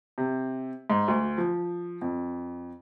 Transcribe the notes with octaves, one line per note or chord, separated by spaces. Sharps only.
C3
G#2
D2
F3
F2